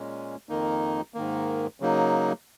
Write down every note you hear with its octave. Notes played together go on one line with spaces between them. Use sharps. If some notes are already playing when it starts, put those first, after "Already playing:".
Already playing: A#2 G#3 C#4
F2 D#3 A#3 D#4
G#2 D#3 A#3
C#3 F#3 A#3 D#4